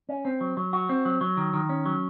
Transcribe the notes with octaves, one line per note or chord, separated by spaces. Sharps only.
C#4
C4
F#3
F#3
F#4
C4
F#3
F#3
D#3
D#3
C#4
F#3